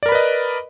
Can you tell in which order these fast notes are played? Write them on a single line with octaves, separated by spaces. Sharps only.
D5 A#4 B5 B4 D#5